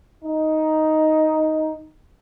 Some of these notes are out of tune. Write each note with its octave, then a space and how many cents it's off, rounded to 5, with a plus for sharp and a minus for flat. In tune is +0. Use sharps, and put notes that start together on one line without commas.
D#4 +5